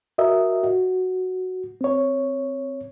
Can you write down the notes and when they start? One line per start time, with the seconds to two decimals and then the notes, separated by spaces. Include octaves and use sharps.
0.18 F#4 A#4 D#5 E5
0.63 F#4
1.81 C4 C#5